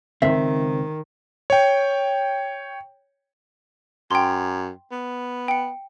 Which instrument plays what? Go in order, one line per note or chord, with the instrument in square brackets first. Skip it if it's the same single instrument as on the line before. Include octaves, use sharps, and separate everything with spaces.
[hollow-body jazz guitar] C#2 C4 [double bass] D#3 [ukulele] E5
[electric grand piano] C#5 G5
[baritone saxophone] F#2 [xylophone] G5 C6
[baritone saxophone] B3
[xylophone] G5 C#7